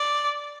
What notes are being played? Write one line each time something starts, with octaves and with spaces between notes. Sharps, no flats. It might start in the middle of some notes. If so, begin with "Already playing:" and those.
Already playing: D5